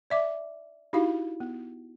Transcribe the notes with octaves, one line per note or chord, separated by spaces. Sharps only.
D5 E5 D6
D#4 E4 F#4 G4 F5
B3